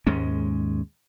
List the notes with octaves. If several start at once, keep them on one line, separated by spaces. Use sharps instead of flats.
D#2 G#2 G#3 C#4